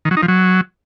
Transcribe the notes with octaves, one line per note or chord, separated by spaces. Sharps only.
D#3
F#3
D#4
F3
F#3